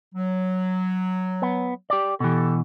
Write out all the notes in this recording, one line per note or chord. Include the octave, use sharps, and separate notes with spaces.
F#3
B3
G4 D5
B2 E3 G4 A4